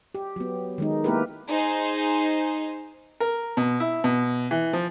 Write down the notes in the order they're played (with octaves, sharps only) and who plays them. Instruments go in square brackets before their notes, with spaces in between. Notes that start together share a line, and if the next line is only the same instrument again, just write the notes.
[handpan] G4
F#3 B3
D#3 G#3 D#4
A#3 B3 E4 G4 A#4 B4
[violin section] D#4 G#4 C5 D#5
[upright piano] A#4
B2
E4
B2
E3
F3